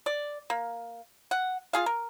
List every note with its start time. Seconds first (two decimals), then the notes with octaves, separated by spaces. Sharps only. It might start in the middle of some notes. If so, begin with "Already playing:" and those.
0.06 D5
0.50 A#3
1.31 F#5
1.73 F4 G#4 F5
1.86 A#4